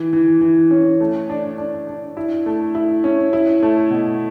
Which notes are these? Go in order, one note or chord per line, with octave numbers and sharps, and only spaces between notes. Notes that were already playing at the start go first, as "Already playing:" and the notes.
Already playing: E3
E3
E3
C#4
A3
D4
D4
D4
E4
A3
E4
C#4
E4
A3
B2